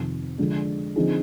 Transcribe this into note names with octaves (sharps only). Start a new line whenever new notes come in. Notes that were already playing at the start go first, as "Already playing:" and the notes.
Already playing: F2 C3 D#3
D3 F3 G#3 D4
D3 F3 C4 D#4 G#4